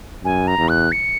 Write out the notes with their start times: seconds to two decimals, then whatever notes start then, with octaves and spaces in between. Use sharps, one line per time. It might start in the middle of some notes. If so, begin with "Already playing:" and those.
0.24 F#2 G#5
0.47 A#5
0.58 E2
0.69 F#6
0.92 C#7